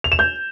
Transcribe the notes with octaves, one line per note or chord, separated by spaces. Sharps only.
F7
E7
G6